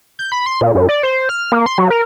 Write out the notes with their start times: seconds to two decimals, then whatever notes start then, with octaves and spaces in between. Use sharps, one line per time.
0.19 G6
0.32 B5
0.46 C6
0.61 A#2
0.75 F#2
0.89 D5
1.03 C5
1.29 F6
1.52 A#3
1.66 C6
1.78 F#3
1.90 A#4